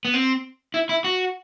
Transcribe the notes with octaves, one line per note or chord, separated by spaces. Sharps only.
B3
C4
E4
E4
F#4